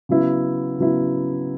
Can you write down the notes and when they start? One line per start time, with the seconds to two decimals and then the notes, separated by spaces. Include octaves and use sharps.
0.09 C#3 F#3 B3 E4
0.79 C#3 F#3 B3 E4